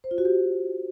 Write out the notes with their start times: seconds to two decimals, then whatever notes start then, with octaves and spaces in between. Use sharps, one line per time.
0.04 C5
0.11 F4
0.18 F#4
0.25 G4